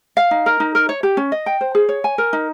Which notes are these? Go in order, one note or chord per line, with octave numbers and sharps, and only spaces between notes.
F5
D#4
A#4
D#4
A#4
C#5
G4
C#4
D#5
G5
C5
G#4
C#5
G#5
A#4
D#4